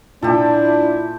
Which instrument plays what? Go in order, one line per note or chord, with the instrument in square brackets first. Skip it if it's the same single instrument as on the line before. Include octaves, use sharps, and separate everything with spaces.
[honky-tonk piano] A#2 [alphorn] D4 [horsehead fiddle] E4 [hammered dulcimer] G4 A4